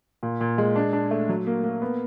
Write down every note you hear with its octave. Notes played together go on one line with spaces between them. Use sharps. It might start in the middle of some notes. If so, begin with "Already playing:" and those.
A#2
A#2
G#3
D4
D4
A3
F#3
A#3
A#3
B3